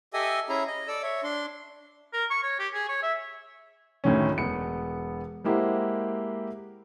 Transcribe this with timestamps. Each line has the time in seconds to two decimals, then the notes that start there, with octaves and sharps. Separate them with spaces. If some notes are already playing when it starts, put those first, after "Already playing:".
0.14 G4 A4 D#5 E5 G#5 D#6
0.49 C#4 E4 G#4 E5 A#5
0.68 D#5
0.88 A4 D5 E6
1.03 C#5 E5
1.24 D4 C6
2.13 A#4
2.30 C#6
2.43 C#5
2.59 G4
2.74 G#4
2.89 C#5
3.02 E5
4.04 D2 A2 D#3 C#4
4.38 E1 B3 C#7
5.44 G#3 A#3 E4 G4 C5 F#5